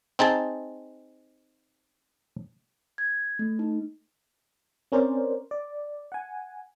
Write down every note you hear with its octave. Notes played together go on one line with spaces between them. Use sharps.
C4 D#4 G#4 A5
G#6
A3
D#4
C4 C#4 A#4 C5 D5
D5
F#5 G#5